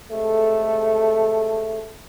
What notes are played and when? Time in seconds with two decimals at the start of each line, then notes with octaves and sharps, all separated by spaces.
0.11 C3 G#3 A3 A4